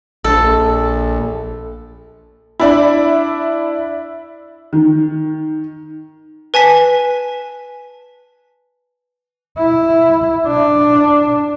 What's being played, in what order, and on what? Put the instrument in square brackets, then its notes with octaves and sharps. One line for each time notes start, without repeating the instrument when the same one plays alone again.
[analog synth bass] A#1 [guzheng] A4
[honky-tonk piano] D4 E4
[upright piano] D#3
[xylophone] B4 G#5 A5 B6
[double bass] E4
D4